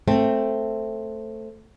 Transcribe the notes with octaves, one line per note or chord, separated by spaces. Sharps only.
A3 C4